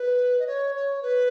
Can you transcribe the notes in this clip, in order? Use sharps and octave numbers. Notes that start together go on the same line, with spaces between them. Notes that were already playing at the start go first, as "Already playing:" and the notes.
Already playing: B4
D#5
C#5
C#5
B4